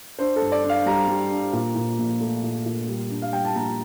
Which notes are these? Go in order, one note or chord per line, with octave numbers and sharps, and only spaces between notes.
D4 C5
A4
G2
D5
D4
F5
G3 A#5
G3
D4
A#2
A#2
A#1
A3
A#2
A#2
G3
D4
F5
G3 G5
A5
A#1 A#5